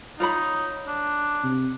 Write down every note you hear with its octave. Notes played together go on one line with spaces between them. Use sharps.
D#4 F4 C#5 B5
D4
C3